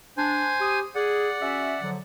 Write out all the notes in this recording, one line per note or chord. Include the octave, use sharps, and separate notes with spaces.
D4 C5 G#5
G4 D#6
G#4 D5 F#5
C#4 F#4 E5
D3 F3 F#3